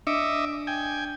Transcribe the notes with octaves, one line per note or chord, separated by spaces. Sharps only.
D4 D#5 E5 D6 C#7
G5 G#5